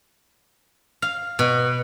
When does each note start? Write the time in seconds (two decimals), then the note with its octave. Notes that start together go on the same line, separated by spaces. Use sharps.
1.02 F5
1.39 B2